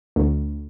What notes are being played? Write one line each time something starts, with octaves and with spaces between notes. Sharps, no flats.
D2